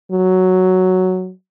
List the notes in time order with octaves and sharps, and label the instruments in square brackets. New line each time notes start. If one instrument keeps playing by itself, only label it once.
[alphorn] F#3